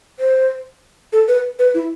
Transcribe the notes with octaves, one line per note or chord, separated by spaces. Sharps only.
C5
A4
B4
B4
E4